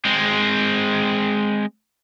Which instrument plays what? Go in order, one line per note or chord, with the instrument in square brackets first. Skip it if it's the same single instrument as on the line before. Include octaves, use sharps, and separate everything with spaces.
[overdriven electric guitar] G#3 C4